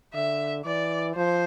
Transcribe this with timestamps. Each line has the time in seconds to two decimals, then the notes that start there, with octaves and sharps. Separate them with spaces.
0.14 D3 E5
0.65 E3 D5
1.16 F3 C5